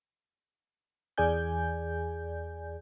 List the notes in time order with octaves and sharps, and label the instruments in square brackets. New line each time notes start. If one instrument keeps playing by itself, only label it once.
[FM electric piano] E2 G#4 D5 G#5 G6